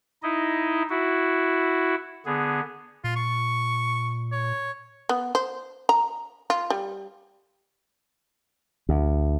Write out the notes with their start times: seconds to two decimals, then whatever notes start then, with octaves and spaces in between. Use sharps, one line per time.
0.23 D#4 E4 D#5
0.90 E4 F#4
2.26 D3 B3 G#4
3.04 A#2 F4
3.16 C#6
4.32 C#5
5.09 B3
5.35 C5
5.89 A#5
6.50 F4
6.70 G3
8.89 D2